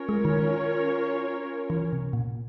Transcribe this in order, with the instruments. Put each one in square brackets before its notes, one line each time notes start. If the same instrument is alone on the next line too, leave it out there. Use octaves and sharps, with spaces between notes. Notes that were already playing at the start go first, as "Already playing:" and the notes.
Already playing: [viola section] C#4 F4 A#4 C#5
[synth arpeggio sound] G#3
D#3
E3
C3
A#2